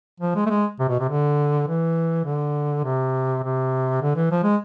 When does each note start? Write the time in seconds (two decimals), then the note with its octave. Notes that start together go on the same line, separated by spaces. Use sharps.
0.20 F3
0.35 G#3
0.46 A3
0.50 G#3
0.79 C3
0.89 B2
0.99 C3
1.09 D3
1.67 E3
2.25 D3
2.84 C3
3.43 C3
4.02 D3
4.16 E3
4.31 F3
4.43 G#3